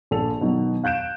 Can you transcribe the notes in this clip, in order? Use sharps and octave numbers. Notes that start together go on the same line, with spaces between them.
A#1 A4 F7
B2 D#3 F#3
F5 F#6 G6 D7 E7